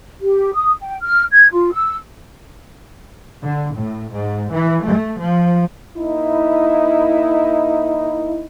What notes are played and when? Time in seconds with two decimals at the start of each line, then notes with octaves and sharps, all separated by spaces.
0.21 G4
0.53 D#6
0.80 G5
1.02 F6
1.32 G#6
1.51 F4
1.72 E6
3.42 D3
3.75 A2
4.12 G#2
4.52 E3
4.83 A3
5.19 F3
5.97 A#3 D#4 E4